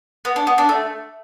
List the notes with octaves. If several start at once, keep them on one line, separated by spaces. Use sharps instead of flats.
B3
D4
B3
D4
A3